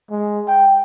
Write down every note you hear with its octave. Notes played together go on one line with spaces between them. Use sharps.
G#3
G5